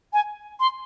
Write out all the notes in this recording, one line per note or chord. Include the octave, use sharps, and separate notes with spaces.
G#5
C6